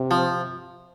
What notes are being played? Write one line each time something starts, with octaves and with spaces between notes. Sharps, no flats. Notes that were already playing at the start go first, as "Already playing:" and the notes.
Already playing: C3
F3